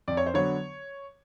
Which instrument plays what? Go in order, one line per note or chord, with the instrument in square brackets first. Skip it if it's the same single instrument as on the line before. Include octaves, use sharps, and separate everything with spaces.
[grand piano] F2 D5
C#5
C5
D3 F#3 B3 C#5